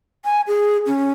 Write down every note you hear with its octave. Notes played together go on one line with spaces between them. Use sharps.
G#5
G#4
C#4